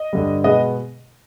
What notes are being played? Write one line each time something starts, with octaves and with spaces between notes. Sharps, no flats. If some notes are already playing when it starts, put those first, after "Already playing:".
Already playing: D#5
G2 D3 G3
B2 G#3 B3 D#5